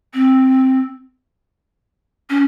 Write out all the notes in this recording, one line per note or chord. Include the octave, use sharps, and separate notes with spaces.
C4
C#4